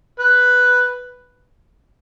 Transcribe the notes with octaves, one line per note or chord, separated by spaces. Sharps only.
B4